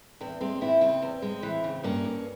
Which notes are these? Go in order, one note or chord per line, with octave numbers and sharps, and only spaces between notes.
E2 C4
G#3 C4
E3 C4 E4
C#3 C4
E2
G#3
E3
C#3
G2 A#3 C#4
G2